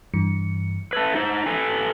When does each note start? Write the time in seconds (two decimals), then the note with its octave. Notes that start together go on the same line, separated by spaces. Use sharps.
0.14 G2 E3 C#7
0.93 A3 B4 A5 E6 G#6
1.15 D#4 C5
1.46 A4 B4 G#5